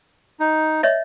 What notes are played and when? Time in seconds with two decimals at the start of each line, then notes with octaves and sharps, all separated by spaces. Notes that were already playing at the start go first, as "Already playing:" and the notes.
0.40 D#4
0.83 C#5 D#5 E5